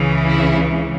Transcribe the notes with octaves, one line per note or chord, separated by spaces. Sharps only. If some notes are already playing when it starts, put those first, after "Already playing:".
Already playing: C#2 C#3 E3
E4